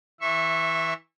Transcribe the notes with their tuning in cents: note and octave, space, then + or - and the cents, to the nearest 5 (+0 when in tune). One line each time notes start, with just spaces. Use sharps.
E3 -15 E5 +5 C#6 -25